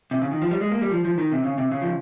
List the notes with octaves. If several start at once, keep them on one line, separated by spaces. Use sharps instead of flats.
C3
C#3
D#3
F3
G3
G#3
A#3
G3
F3
F3
D#3
C3
C#3
C3
C#3
F3